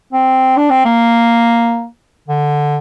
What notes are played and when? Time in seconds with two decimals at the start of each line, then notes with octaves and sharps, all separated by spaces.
0.13 C4
0.57 D4
0.70 C4
0.85 A#3
2.28 D3